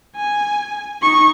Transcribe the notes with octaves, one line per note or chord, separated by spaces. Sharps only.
G#5
D#4 C#6